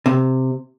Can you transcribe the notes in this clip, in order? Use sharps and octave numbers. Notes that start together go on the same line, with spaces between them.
C3